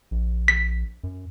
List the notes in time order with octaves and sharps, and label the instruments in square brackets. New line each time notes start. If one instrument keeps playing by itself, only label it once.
[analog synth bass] A#1
[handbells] B6
[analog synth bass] F#2